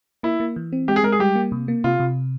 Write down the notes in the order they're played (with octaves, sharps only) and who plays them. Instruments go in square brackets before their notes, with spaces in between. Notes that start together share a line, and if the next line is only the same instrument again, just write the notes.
[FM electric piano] A#3 [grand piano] E4
[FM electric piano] A#3
E3
C4
[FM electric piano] G#3 [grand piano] G4
[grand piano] G#4
[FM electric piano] G#3 [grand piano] A#4
[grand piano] G#4
[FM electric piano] G3 [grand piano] G4
[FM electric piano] A#3
C3
A#3
[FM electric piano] C3 [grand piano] F4
[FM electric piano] C3